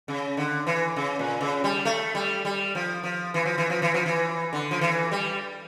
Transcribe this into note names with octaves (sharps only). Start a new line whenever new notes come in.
C#3
D3
E3
C#3
A#2
C#3
G3
A3
G3
G3
F3
F3
E3
F3
E3
F3
E3
F3
E3
D3
F3
E3
G3